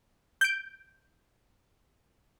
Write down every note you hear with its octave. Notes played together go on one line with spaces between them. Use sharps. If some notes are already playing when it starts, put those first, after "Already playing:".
G6 D7